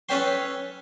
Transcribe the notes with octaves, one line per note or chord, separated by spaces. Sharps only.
C#4 A4 B4 C#5 G5 C6